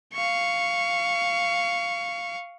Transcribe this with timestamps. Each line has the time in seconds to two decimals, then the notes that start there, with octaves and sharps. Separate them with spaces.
0.14 F5 C#6